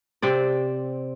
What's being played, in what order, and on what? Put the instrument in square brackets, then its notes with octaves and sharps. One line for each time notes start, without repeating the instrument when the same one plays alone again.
[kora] C3 C4 D5